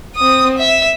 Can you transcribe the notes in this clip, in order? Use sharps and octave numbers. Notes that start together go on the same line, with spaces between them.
C4 D#6
E5